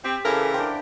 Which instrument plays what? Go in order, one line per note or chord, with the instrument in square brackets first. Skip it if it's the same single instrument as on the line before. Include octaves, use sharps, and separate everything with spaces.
[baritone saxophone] C4 [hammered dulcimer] G4
[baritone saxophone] C#3 [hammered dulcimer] E3 F5 [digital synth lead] A4 [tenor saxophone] A#4
[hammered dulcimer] D4 C5 [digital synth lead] G5